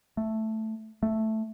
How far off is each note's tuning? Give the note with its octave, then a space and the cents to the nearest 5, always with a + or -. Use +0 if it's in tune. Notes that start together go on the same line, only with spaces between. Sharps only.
A3 +0
A3 +0